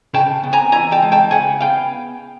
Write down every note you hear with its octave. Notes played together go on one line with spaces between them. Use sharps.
C#3 G5 A5
B3
G#5 A#5
E3 G#5 A#5
G5 A5
G#3
G5 A5
C#3 F#5 G#5
B3 F5 G5